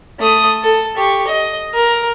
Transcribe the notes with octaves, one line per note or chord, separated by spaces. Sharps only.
A3 D#6
A4
G4 C#6
D#5
A#4